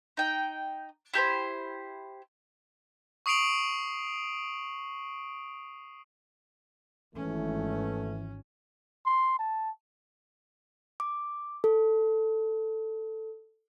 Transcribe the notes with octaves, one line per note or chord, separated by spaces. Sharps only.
D#4 G5
E4 G4 A4 C5
C#6 D#6 C7 D7 F7 F#7
G#1 E3 A3 C#4
C6
A5
D6
A4